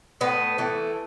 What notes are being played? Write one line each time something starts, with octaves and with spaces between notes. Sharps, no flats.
A2 B3
E3 A3